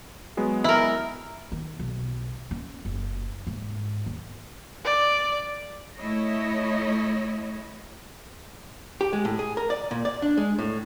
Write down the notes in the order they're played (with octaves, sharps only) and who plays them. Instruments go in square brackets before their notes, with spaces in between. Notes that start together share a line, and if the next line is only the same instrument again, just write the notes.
[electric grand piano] F#3 G#3 B3
[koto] E4 A#4
[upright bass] D#3
B1
C#4
F#1
G#2
D#2
[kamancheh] D5
[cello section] A3 E4 C#5 D#5
[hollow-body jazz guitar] G4
G#3
A2
G#4
A#4
D5
A#2
D5
D4
G#3
A2